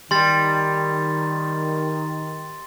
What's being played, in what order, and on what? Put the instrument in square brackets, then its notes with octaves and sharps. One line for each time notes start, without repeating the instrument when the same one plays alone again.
[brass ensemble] D#3 [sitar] G3 [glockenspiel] C6 A6